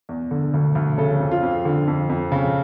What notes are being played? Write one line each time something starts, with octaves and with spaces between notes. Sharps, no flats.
E2
D3
D2
D2
C#3 A4
F2
F4
F2
D3
F2
F2
C#3